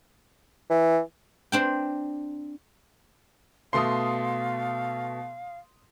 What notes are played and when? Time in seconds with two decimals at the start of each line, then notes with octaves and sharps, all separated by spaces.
0.70 E3
1.52 C4 D4 G5
3.73 B2 A3 F5 C6 D#6 C7